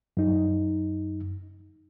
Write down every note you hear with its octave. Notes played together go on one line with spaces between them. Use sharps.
F#2 D#4